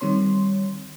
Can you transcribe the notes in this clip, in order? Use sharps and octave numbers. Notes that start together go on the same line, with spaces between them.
D#3 G3 C4 C#5 C6